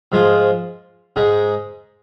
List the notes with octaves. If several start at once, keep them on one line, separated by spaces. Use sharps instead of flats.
G#2 F3 G#3 F4
G#2 G#3 D#4